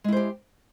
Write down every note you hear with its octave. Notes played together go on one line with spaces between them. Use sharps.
G#3 E4 G4 C5